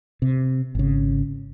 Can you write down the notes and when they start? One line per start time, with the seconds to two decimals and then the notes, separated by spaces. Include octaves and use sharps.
0.22 C3
0.75 G#1 C#3